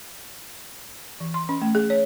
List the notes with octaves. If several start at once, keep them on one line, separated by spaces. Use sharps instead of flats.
E3
C6
C#4
A3
G#4
C#5